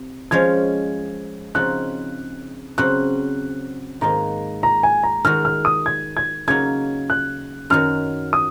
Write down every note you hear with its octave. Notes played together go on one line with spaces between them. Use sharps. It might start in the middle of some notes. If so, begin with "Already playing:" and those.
Already playing: C3
F3 G#3 C#4 G#6
C#3 F3 C4 D#4 F#4 F#6
C#3 F#3 C4 F#4 F#6
G#2 D#3 A#3 D#4 A#5
A#5
G#5
A#5
D#3 G#3 D#4 F#4 F6
F6
D#6
G#6
G#6
C#3 F#3 A#3 D#4 F#4 G#6
F#6
F#2 D#3 F#3 F6
D#6